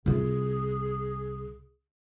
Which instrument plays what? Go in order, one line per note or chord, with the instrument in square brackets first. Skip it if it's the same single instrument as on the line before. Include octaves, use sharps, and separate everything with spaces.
[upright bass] C2 F4 [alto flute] G#4